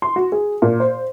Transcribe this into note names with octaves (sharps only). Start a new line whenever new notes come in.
C6
F#4
G#4
A#2
C5